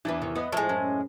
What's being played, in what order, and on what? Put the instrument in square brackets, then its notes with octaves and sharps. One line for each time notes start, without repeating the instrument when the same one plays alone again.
[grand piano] E2 E3 [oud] D4 E4 B4
[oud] C3 D#3
[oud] B3 E4 [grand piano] B4 D#5
[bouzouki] A2 G#3 [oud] F3 E4 [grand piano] A5
[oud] F#2 C#4 [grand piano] A5